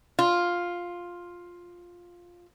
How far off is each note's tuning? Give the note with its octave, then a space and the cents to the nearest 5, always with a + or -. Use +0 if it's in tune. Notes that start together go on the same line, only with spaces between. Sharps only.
F4 +5